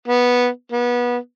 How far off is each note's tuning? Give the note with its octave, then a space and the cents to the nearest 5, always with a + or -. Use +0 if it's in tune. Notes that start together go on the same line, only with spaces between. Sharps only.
B3 -10
B3 -25